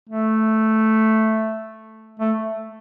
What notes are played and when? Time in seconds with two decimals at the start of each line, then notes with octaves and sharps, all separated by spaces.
0.09 A3
2.20 A3